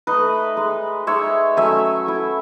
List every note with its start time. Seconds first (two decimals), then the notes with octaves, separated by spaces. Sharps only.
0.07 A3 D#4 B4 D#5
0.57 G#3 D#4
1.07 G#3 D#4 C#5 E5
1.57 F#3 A3 C#4 E5 G#5
2.07 A3 E4